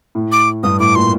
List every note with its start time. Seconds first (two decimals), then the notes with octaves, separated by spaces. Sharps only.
0.15 A2
0.32 D6
0.63 G2 D#6
0.80 A2 D6
0.95 A#2 C6